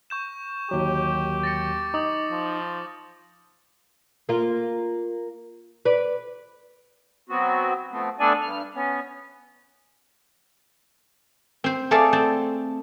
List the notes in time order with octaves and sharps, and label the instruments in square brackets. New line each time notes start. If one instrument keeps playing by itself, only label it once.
[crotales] C#6 G6 E7
[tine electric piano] G1 D#2 F#3 [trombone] G4
[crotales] A6 A#6 C#7
[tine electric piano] D#4 [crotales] D6 D#6
[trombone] F3
[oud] A#3 F4
B4 D5
[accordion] F#3 B3 C4 F#4
F3 A3 B3 C4
A3 B3 D4 A4 D5 G#5
G2 F6
B3 C#4
[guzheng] C4 C5
A3 G#4 A4 D5 F5 A5
C4 G5 A5